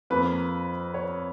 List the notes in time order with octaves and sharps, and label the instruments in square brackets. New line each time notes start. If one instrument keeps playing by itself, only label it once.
[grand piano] F2 F3 A#3 B4
C#5